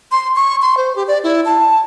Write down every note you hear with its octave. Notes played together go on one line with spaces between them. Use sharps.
C6
C#6
C6
C5
G4
D5
E4
A5